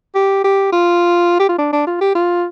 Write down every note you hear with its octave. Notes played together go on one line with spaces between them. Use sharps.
G4
G4
F4
G4
F4
D4
D4
F4
G4
F4